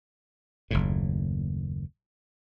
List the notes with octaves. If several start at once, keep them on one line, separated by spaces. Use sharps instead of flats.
F#1 D#2 A2